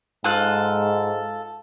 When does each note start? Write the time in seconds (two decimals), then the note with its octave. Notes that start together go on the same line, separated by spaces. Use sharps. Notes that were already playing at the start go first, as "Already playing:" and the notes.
0.24 G#2 F4 A4 F#6